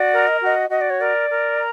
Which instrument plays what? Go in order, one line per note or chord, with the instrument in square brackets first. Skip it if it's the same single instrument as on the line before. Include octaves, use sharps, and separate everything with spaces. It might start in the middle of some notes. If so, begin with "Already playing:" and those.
Already playing: [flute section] F#4 [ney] D5
[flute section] A#4
[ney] D#5
[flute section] F#4 [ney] D#5
[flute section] F#4 [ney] D#5
[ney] D5
C#5
[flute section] A#4 [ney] D5
[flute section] A#4
A#5